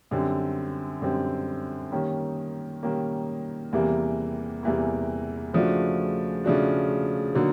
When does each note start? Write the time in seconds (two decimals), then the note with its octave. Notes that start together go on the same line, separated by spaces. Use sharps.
0.11 F#2 D3 G3 C4
1.02 F#2 D3 G3 C4
1.92 D#3 G3 A#3 C#4
2.83 D#3 G3 A#3 C#4
3.73 E2 C3 E3 G3 A#3
4.63 E2 C3 E3 G3 A#3
5.53 C#3 F3 A3 D4 F#4
6.44 C#3 F3 A3 D4 F#4
7.35 D3 F#3 A#3 D#4 F#4